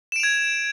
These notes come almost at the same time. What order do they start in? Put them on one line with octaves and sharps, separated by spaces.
E7 D7 F7 G#6